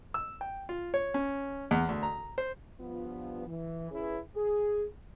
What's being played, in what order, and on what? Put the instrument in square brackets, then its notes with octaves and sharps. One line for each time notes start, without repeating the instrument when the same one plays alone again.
[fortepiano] E6
G5
F4
C#5
C#4
E2
D2
A#5
C5
[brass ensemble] G2 F3 B3 F4
E3
C#4 E4 G#4 B4
G#4